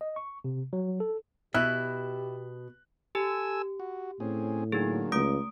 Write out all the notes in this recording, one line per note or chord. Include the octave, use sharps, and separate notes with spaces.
D#5
C#6
C3
F#3
A4
B2 E4 G4 F#6
G4 A4 G#5 E6
F#4
A2 C4 C#4 G#4
D3 F#3 A#3 D#4 G#4
C#2 A3 D#6 D7